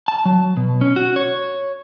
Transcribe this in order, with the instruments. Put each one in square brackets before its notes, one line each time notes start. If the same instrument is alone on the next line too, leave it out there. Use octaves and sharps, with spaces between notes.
[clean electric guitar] A5
F#3
B2
C#4
F#4
C#5